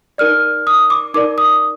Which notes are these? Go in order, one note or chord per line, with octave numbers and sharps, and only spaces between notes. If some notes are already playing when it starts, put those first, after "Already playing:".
D#4 A#4 D5 F6
D#6
D6
D#4 A#4 D5 D6
D#6